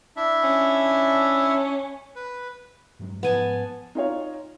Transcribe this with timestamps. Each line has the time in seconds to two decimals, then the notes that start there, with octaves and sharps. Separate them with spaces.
0.16 D4 E4 E5
0.43 C#4
2.16 B4
2.99 G2 F#3 G#3
3.23 G#2 F3 B3 G#5 A5
3.95 D#4 F4 C#5